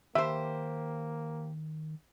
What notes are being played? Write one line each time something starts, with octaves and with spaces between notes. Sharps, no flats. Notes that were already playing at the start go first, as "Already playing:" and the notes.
D#3 A#3 G4 C5 E5